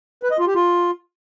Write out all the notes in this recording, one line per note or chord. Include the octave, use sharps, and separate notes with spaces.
B4
D#5
F4
G4
F4